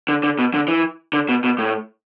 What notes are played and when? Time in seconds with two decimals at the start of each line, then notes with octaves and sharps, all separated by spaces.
0.09 D3
0.23 D3
0.39 B2
0.54 D3
0.68 E3
1.13 D3
1.29 B2
1.44 B2
1.58 A2